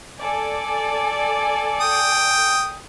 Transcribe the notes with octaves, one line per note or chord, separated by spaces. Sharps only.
A4 D5 G#5
G5 D#6